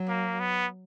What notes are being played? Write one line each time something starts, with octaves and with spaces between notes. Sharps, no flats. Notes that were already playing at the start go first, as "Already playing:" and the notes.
Already playing: F#3
A#3
B3